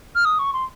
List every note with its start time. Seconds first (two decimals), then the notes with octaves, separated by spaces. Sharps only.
0.15 F6
0.25 D#6
0.39 C#6
0.53 C6